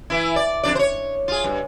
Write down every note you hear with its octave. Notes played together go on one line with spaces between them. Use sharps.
E3 E4
D5
F2 D4 D5
C5 C#5
F4 G#4
G2